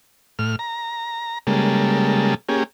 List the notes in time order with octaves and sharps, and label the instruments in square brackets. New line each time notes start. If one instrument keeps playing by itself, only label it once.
[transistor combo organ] A2 F6
A#5
C#3 G3 G#3 A#3 A4
A#3 C#4 G4 G#4